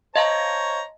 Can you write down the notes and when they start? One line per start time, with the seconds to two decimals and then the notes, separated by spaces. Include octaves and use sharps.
0.16 C5 C#5 D#5 F5 A5 A#5